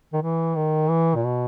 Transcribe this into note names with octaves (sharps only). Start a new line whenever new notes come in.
D#3
E3
D#3
E3
A#2
B2